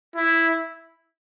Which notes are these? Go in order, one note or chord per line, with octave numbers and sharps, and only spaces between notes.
E4